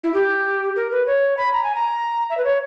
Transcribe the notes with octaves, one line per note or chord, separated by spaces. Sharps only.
E4
G4
A#4
B4
C#5
B5
A#5
G#5
A#5
E5
B4
C#5